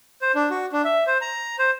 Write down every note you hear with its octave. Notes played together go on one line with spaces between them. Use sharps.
C5
D4
F#4
D4
E5
C5
A#5
C5